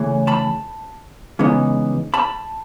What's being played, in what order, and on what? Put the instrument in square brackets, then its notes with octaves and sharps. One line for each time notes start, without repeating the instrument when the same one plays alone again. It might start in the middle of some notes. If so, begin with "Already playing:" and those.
Already playing: [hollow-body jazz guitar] C#3 E3 A3
A5 B5
C#3 E3 G#3 B3 D#4
A5 B5